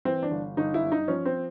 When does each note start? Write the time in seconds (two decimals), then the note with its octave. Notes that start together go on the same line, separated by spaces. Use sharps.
0.05 E3 C4
0.23 D4
0.31 G1
0.57 G1 D#4
0.74 E4
0.83 G2
0.92 D#4
1.08 F3 C#4
1.25 C4